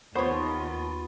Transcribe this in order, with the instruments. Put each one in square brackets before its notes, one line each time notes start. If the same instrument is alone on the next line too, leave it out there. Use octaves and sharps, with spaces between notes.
[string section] D#2 [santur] B3 C6 C#6 [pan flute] F4 [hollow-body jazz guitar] C5 C#5